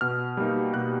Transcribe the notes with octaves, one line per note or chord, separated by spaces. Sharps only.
B2 F6
G3 A#3 D#4
B2 F#6